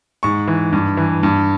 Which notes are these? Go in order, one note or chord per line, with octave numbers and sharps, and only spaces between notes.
G#2 C#6
E3
G2
E3
G2